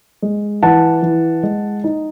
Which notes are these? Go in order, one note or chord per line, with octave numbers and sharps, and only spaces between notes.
G#3
E3 F#5 A5
E3
G#3
D#4